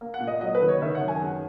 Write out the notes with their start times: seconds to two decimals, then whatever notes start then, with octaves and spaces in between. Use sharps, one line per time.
0.01 A#3
0.14 F#5
0.20 A#2
0.27 D#5
0.41 F#3 D#5
0.55 B4
0.61 D#3
0.68 C#5
0.82 D#3 E5
0.95 F#5
1.02 F#2
1.08 G#5
1.22 G#3 F#5